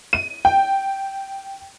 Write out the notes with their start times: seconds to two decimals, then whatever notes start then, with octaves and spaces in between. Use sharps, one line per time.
0.13 D#7
0.45 G5